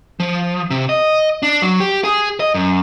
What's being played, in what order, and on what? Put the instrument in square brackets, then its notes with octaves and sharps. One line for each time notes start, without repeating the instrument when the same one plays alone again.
[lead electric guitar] F3
C3
D#5
D4
F#3
G4
G#4
D#5
F#2